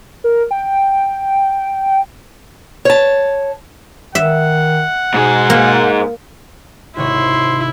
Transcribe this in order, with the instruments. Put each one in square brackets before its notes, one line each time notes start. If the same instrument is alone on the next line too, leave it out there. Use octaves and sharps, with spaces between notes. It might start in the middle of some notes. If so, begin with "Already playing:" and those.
[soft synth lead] A#4
G5
[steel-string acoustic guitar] C#5 A5
[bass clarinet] D#3 [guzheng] E5 [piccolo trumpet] F#5
[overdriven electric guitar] G#2 G#4 [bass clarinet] B2
[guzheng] A#3
[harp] G#1 C3 C#5 [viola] E4 [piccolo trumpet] C6